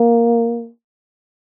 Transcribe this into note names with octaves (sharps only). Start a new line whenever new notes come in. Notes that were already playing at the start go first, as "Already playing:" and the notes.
Already playing: A#3